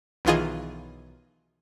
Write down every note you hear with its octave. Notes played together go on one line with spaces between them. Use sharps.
B1 D#3 E3 F4 G#4 D#5